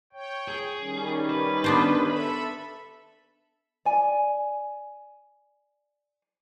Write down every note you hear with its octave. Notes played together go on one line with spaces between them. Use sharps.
C#5 G5
G#4
D#3 G3 C#4
B4
B3 D4 C5
A4 E5 B5
D5 G#5